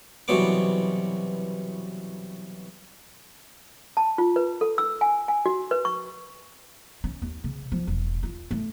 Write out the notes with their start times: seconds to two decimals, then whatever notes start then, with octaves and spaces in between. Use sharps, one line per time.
0.28 C2 B2 E3 F#3 B3 D6
3.97 A5
4.18 F4
4.36 B4
4.61 A4
4.78 E6
5.01 G#5
5.28 G#5
5.46 F#4
5.71 B4
5.85 C#6
7.04 C#4
7.22 D#2
7.44 C#3
7.72 F3
7.87 E1
8.23 F4
8.51 A3